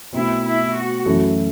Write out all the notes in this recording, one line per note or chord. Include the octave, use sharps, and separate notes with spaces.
B2 A3 C4 E4
E4
F#4
F#2 E3 A3 E4 A4